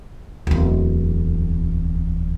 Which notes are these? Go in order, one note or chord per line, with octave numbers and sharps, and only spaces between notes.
D1 E2